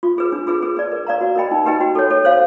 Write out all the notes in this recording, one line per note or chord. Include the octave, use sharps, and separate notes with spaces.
F4
G#4 B4
D4
F4 G#4 B4
G#4
B4 D5
A#4
D5 F5 A#5
F#4
A#4 D#5 G5 B5
D#4
G4 B4 D#5 G5
F#4
A4 C#5
A4
C5 F5